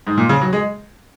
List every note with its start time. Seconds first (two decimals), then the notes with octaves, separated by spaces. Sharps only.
0.07 G#2
0.17 A#2
0.29 C#3
0.41 F#3
0.53 G#3